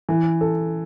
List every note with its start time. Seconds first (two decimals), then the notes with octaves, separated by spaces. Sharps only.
0.09 E3
0.41 A4